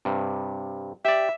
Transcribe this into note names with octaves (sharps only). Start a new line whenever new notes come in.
G2 C3
G4 D5 E5